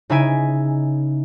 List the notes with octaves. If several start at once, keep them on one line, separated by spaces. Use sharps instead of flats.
C#3 D#4 E4 E5 G#5 D7